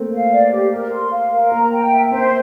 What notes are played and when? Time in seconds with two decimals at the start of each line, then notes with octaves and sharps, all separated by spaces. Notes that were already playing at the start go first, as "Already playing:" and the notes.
Already playing: A3 A#3 C4
0.12 F5
0.32 D5
0.52 G4
0.72 A#4
0.92 C6
1.11 F5
1.32 A#4
1.52 A#3 A#5
1.72 G5
1.91 E5
2.11 C4 C5